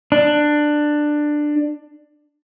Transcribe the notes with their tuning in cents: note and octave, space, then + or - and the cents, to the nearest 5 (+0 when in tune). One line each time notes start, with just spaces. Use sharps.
D4 +15